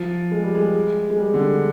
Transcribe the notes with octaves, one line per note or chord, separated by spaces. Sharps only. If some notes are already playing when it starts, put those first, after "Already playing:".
Already playing: F3
G#3
G3
G#3
G#3
G3
D3